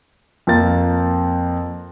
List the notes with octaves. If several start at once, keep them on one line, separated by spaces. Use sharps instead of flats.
F2 A#3 A6